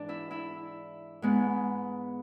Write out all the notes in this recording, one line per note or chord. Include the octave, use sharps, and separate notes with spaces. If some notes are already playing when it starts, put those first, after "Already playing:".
Already playing: G#2 E3 D4 D5
E4 E5
E4 E5
G#2 G#3 B3